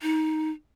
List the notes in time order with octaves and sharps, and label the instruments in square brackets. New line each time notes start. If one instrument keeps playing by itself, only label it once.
[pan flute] D#4